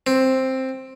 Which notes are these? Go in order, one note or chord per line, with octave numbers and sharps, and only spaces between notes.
C4